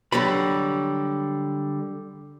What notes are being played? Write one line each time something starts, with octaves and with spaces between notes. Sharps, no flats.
D3 F#3 G3 B5